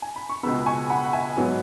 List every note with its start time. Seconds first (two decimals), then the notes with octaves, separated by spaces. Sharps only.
0.02 G#5
0.16 B5
0.29 C#6
0.43 C#2 B2 G#3 B3 B5 E6
0.66 G#5 C#6
0.90 F#5 B5
1.05 F#5
1.13 E5 G#5
1.37 G#2 F#3 B3